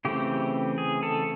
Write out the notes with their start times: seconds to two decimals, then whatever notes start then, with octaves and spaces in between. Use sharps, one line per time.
0.05 C#3 E3 A3 C4 G4
0.78 G#4
1.03 A4